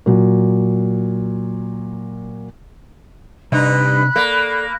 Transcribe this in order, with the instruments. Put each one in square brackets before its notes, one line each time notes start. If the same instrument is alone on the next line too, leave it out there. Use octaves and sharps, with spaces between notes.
[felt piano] A#2 F#3
[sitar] G2 D#4 [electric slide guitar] C3 [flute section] B5 F#6
[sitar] A#3 [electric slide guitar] A4 D5